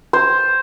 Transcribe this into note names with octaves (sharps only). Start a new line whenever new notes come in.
C5